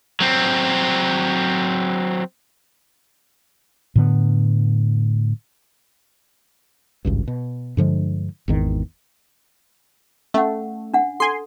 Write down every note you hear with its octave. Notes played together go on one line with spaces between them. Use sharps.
F#3 C4
A2 D3 B3
G#1 C#2 G2
B2
G2 D3 F3 G#3
G#1 E2 D#3
A3 C#4 F#5
D4 F#5
A4 G#5 C6